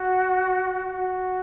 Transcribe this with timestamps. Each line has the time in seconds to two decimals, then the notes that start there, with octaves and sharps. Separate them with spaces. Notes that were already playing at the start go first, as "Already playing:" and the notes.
Already playing: F#4
0.92 F#4